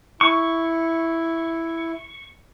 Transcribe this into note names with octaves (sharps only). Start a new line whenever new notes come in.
E4 C#6